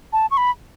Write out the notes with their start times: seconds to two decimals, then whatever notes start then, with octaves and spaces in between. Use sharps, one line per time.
0.13 A5
0.31 C#6
0.37 B5